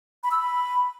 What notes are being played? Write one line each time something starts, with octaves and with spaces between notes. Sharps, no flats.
B5
E6
B5